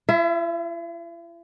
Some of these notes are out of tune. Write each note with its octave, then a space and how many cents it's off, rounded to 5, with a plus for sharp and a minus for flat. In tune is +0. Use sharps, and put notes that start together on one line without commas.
E4 +45 E5 +0